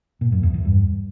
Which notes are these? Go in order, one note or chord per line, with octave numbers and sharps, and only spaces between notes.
A#2
F#2
E2
E2
G2